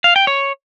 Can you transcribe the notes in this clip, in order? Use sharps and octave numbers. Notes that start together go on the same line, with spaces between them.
F5
G5
C#5